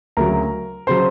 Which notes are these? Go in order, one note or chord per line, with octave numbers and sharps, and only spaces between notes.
D2 C#3 F#3 A#4 A#5
C#3 F#3 C5 C6